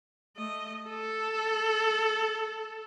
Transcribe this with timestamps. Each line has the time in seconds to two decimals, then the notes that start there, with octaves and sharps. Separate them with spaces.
0.37 A3 D#5
0.89 A4